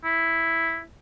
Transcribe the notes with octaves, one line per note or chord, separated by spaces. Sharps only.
E4